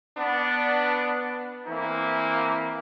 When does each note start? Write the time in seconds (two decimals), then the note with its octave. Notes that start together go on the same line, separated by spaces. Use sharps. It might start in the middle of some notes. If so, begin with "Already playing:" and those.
0.18 B3 D4
1.66 E3 A#3 C4 E4